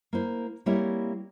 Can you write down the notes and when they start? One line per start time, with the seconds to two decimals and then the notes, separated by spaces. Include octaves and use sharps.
0.13 A#3 E4 C5
0.66 G3 A#3 C4 E4 C#5